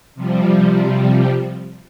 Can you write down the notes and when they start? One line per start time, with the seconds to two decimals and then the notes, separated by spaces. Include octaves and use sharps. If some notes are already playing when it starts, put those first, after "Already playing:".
0.15 C3 F3 G3